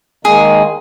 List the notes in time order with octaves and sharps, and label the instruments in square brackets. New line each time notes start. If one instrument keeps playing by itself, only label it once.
[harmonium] D#3 G#3 A#3 [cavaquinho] G#4